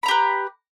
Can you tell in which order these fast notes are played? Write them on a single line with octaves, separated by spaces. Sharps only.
B5 A#5 G4 B4